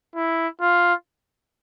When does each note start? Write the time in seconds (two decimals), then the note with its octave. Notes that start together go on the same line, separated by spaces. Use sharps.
0.16 E4
0.61 F4